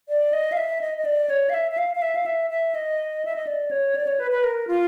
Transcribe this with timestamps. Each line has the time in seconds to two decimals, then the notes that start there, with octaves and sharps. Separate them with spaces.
0.09 D5
0.33 D#5
0.52 F5
0.57 E5
0.81 D#5
0.98 D#5
1.05 D5
1.30 C#5
1.49 F5
1.54 E5
1.71 E5
1.78 F5
1.95 F5
2.02 E5
2.15 F5
2.26 E5
2.50 E5
2.75 D#5
3.25 E5
3.36 D#5
3.47 D5
3.71 C#5
3.95 D5
4.07 C#5
4.20 B4
4.31 B4
4.44 A#4
4.67 F4